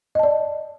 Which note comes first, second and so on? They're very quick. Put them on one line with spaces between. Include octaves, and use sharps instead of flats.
D#5 A5 D5